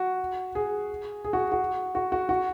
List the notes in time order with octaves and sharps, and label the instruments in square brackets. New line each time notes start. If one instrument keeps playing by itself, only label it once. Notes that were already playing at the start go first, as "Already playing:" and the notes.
Already playing: [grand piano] F#4
G#4
G#4
F#4
F#4
F#4
F#4
F#4